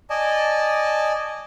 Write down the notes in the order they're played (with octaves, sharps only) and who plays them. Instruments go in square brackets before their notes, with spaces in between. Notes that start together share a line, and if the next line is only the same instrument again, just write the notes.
[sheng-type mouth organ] D5 D#5 G#5 A5